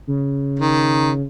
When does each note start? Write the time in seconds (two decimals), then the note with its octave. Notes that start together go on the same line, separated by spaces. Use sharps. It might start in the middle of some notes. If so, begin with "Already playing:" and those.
0.07 C#3
0.59 D#3